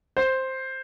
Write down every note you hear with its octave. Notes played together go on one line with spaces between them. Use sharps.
C5